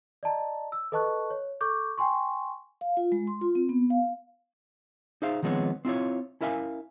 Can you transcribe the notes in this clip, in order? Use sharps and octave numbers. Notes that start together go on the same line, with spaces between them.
D5 D#5 A5 A#5
E6
A4 B4 D#5 A5 C#6 F#6
C#5
A4 C#6 D6 G6
G5 G#5 C6 C#6
F5
F4
G#3
C6
F4
C4
B3
F5
D#4 G#4 C5 E5 F5
D#3 F3 G#3 B3 C4 C#5
C4 E4 F4 C#5
C#4 E4 A#4 E5 F5 G#5